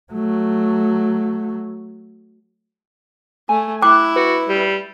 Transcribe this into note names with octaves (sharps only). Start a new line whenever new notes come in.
F#3 A3
A3 G#5
E4 G5 D6 F#6
F#4 B4
G3